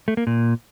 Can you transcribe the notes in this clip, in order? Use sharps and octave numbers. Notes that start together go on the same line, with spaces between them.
A3
A#3
A#2